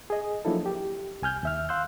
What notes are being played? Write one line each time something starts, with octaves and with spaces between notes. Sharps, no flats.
G#4 D#5
F3 F#3 A#3 D4 E4 A4
G4
C2 G#5 F6 G6
D#2 E5 F6
F5 C6 E6 F#6 G6